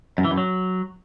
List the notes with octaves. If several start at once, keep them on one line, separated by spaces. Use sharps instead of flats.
F#2
E3
F#2
F#3